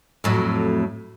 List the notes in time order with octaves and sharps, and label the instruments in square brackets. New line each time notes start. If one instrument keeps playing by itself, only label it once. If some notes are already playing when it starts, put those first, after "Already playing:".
[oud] F2 A2 F#3